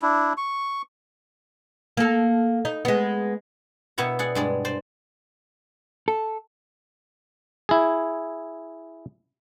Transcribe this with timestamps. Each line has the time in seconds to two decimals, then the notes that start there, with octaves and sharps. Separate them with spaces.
0.02 D4 E4
0.37 C#6
1.97 A#3 A4
2.65 D#4
2.85 G#3 B3
3.98 B2 B3 E4 C#5 A#5
4.19 G#4 D5 F#5
4.35 G2 G#3 D5
4.65 C5 D5
6.08 A4
7.69 E4 G#4